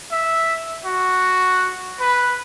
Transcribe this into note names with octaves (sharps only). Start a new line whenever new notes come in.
E5
F#4
B4